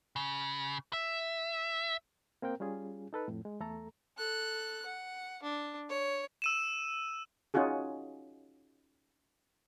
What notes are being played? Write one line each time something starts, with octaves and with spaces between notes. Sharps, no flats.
C#3
E5
A#3 C4 A#4 G5
G3 C#4 F4 G#4
D#4 A4 B4
F2 A2
G#3
E2 A3 A4 A#5
A4 F#6
F#5
D4
C#5
E6 D#7 E7
C#4 D#4 F4 F#4 G#4